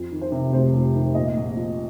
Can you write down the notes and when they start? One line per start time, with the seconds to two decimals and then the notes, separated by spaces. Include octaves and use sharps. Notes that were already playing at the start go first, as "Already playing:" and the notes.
Already playing: F2
0.11 D#3
0.21 C5
0.32 C3
0.53 F1 C5
0.73 F2
0.94 D#3
1.15 A#2 D#5
1.37 A#1
1.57 F3